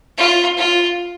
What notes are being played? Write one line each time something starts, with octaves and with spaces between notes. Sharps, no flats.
F4
F4